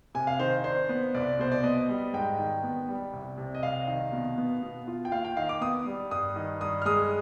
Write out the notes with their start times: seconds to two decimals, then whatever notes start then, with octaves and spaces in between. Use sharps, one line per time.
0.15 C3 G#5
0.27 F5
0.39 D#3 C5
0.64 D4 C5
0.89 B3
1.14 C2 D5
1.39 B2 C5
1.52 D5
1.64 B3 D#5
1.89 G3
2.13 G#2 G5
2.38 D#3
2.63 B3
2.89 G3
3.13 C2
3.38 C3
3.55 D#5
3.63 C2 F5
3.87 D#3
4.12 B2
4.38 B3
4.62 B2
4.87 F4
5.05 G5
5.12 D#2 F5
5.25 G5
5.37 D#3 F5
5.49 D6
5.61 B3 D#6
5.87 G3
6.11 G2 D#6
6.36 D#3
6.61 G2 D#6
6.82 F6
6.85 G#3 D#6